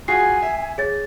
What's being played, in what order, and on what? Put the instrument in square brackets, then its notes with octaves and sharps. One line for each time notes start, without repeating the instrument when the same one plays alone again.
[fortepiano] F4 F#4 G#4 [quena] G#5 [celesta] C7
[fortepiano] E5
[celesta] G#4 C#5 A6